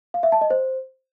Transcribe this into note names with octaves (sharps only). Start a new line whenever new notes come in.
F5
E5
A5
D#5
C5